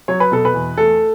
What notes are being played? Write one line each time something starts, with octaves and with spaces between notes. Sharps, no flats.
F#3 C#5
B4
B2 A4
B4
E2
A3 A4